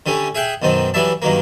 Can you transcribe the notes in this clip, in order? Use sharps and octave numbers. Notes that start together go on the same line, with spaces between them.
D3 G3 A3 C#4
G#4 E5 F#5 G5
B1 F#2 D#3 C4 A5
E3 F#3 G3 D5 E5 A5
G2 D#3 F#3 A#3